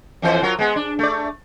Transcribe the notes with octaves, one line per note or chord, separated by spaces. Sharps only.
F2 E3 C5
F#3 F4 A#4
G#3 B3
D4
A3 D5